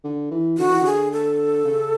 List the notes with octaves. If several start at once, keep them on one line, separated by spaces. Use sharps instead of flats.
D3
E3
D3 F#4
E3
D3 G#4
A4
C#3